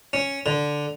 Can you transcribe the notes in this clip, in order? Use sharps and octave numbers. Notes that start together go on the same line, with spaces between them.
C#4
D3